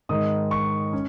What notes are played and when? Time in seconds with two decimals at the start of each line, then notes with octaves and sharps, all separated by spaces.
0.09 G#2 D#3 G#3 D#4 D#6
0.51 C#6
0.93 C#4